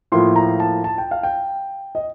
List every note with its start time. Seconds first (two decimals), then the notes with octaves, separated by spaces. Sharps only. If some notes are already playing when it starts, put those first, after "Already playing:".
0.12 A2 F3 A#3 F4 C6
0.36 A#5
0.60 A5
0.84 A5
0.98 G5
1.11 F5
1.23 G5
1.95 D#5